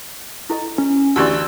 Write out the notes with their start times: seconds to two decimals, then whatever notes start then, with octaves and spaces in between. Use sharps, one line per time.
0.50 E4 A4 D#5
0.78 C#4
1.16 D2 E3 F#4 G4 D5 C6 E6